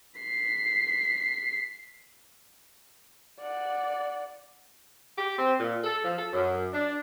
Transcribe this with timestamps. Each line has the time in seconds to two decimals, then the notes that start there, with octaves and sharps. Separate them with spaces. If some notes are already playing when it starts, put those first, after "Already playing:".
0.20 B6 C7
3.39 D5 F#5
5.17 G4
5.38 C4
5.59 A#2
5.84 A4
6.04 F3
6.17 A4
6.32 F#2
6.72 D4